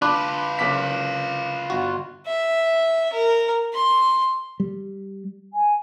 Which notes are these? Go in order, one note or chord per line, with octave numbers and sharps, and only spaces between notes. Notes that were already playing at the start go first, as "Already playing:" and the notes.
D4 F4 B4 B5 D6 F#6
F#1 D6 B6
G1 F#4
E5
A#4
C6
G3
G#5